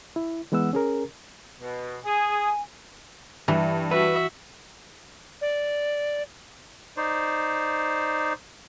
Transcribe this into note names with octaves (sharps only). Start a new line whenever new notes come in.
E4
E3 G#3 B3 F#5 E6
C#4 G#4 A#4
B2
G#4 G#5
G2 E3
F#4 B4 E5
D5
D#4 C5 D5